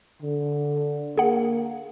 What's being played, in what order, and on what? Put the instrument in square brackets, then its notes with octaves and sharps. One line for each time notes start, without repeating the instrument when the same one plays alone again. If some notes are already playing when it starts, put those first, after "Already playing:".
[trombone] D3
[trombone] A#3 [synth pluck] G#4 F#5